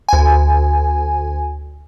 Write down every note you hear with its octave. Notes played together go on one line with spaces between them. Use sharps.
D2 G#5